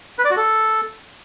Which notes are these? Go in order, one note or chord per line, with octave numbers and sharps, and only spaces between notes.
B4
D5
F#4
A4